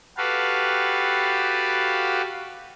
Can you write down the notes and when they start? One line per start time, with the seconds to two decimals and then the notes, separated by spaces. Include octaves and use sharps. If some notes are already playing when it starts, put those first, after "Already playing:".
0.17 F#4 G4 A4 B4 F5